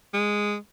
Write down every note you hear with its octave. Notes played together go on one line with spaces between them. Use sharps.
G#3